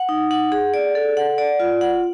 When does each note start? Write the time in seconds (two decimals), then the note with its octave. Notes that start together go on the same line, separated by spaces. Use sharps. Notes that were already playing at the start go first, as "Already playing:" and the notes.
Already playing: F#5
0.09 D#4
0.31 F#5
0.52 G#4
0.74 D5
0.95 A4
1.17 F#5
1.38 D5
1.60 F4
1.81 F#5